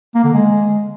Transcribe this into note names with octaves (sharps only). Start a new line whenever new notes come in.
A#3
D3
G#3